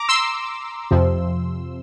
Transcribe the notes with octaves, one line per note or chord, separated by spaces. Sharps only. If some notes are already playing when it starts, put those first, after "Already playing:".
Already playing: A#5 D6
C6 E6
F2 C3 F3